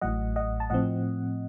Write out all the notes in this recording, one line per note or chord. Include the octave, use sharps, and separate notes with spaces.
A1 A2 F#3 D#5 F#5
D#5 F#5
A5
A2 F3 C4 D#5 F#5